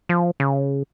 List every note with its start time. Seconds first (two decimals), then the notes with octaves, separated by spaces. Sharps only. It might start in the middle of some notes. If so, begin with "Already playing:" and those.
0.09 F3
0.40 C#3